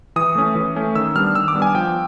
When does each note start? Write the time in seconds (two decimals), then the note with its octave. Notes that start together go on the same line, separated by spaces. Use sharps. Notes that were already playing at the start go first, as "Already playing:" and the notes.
0.16 E3 D#6
0.35 A3 C#4
0.55 E3
0.76 A3 C#4
0.95 D#3 E6
1.15 G3 B3 D4 F6
1.35 D#3 E6
1.48 D6
1.55 G3 B3 D4
1.62 G#5
1.75 F3 G5